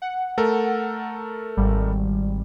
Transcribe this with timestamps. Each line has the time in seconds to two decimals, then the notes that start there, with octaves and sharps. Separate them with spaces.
0.02 F#5
0.38 A3 A4 A#4
1.57 G#1 G3